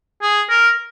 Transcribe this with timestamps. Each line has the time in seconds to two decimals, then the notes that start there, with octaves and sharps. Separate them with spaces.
0.22 G#4
0.50 A#4